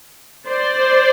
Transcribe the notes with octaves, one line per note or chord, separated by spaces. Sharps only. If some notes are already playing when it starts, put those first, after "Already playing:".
C5 D5